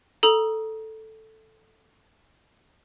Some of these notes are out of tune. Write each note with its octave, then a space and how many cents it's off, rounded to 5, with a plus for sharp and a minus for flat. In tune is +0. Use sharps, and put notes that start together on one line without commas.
A4 +0 A#5 +20 D#6 +0